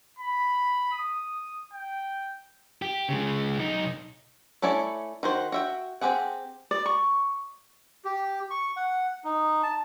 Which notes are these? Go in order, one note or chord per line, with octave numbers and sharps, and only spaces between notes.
B5
D#6
G5
G4
C#3 G#3
B1 D#4
A3 C#4 E4 C#5 D5
D#3 F#4 C5
F#4 E5 G5
C4 D#4 G4 G#4 F#5
D5
C#6
G4
C#6
F#5
D#4
A5